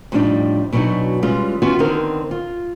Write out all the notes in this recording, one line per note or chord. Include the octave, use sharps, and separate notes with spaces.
F2 A2 G3 A3 D4 D#4
B2 E3 F#3 D4 D#4 F#4
E3 G3 G#3 C#4 F4
E3 B3 C#4 F4 F#4
D3 D#3 B3 C4 D#4 A#4
F4